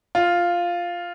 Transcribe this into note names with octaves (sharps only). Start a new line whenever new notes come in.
F4